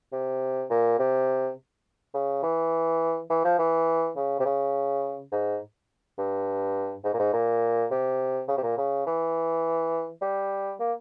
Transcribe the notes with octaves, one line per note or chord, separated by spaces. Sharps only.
C3
A#2
C3
C#3
E3
E3
F3
E3
C#3
C3
C#3
G#2
G2
G#2
A#2
G#2
A#2
C3
C#3
C3
A#2
C#3
E3
G3
A#3